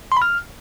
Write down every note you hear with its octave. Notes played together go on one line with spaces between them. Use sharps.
C6
B5
F6